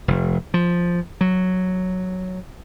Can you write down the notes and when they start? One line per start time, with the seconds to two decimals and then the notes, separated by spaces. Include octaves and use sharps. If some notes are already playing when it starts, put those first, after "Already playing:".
0.08 F1
0.54 F3
1.21 F#3